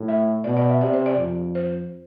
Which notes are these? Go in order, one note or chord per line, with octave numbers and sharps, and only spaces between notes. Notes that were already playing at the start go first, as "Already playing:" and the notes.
Already playing: A2
E5
B2 D5
D5
E5
C3 D5
C5
D5
F2
C5